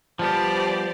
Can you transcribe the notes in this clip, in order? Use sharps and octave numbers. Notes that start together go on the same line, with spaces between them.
F3 G3 B3 G4 C5 D5 A5